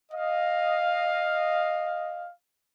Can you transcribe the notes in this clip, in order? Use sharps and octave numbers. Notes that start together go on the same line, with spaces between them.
D#5 F5